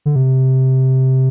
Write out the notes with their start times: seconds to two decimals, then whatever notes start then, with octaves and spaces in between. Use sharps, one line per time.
0.06 D3
0.16 C3